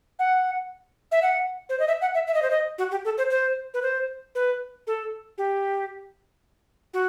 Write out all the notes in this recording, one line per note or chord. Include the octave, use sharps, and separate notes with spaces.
F#5
E5
F#5
C5
D#5
E5
F#5
E5
E5
D#5
C5
D#5
F#4
G4
A4
C5
C5
B4
C5
B4
A4
G4
F#4